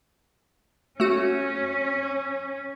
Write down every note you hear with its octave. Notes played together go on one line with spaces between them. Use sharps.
A3 C#4 F#4